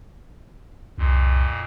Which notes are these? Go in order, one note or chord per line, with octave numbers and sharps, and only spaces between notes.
C2 F2 A#2